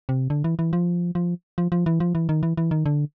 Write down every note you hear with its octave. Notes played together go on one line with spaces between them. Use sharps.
C3
D3
E3
E3
F3
F3
F3
F3
E3
F3
E3
D#3
E3
E3
D#3
D3